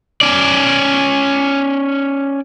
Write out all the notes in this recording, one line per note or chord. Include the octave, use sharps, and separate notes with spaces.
C#4 D5